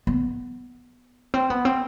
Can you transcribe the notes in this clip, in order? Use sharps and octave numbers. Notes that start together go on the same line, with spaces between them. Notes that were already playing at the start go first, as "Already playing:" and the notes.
B3
C4
B3
C4